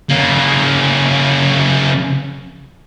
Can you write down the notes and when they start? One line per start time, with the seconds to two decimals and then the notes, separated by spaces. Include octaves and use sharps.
0.10 C#3 A#3